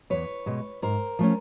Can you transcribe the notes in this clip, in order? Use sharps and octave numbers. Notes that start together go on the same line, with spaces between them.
E2 B4 C#5
B2 G#3
G#2 A#4 C5
F3 A3 C#4